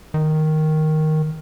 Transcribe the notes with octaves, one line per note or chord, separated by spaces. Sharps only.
D#3